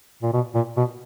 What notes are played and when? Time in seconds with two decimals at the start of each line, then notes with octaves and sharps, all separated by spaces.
0.23 A#2
0.33 B2
0.55 A#2
0.77 B2